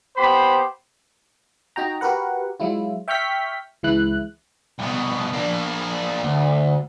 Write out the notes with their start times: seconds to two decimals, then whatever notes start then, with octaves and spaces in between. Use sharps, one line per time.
0.17 B3 G4 C5 B5
1.76 D#4 F#4 G5 A#5
2.01 F#4 G4 A#4 B4 F#5
2.60 F#3 G#3 E4 F4
3.08 E5 G5 C#6 F6 G6 B6
3.83 C#2 E3 G#3 E4 F#6
4.79 C2 B2
5.33 A#3 D4
6.23 D2